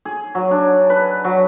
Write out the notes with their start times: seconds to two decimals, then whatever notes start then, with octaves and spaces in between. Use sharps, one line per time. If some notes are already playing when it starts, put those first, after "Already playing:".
0.05 G#4
0.35 F#3
0.51 D4
0.90 B4
1.24 F#3